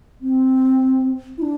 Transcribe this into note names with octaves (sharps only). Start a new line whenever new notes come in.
C4
E4
D4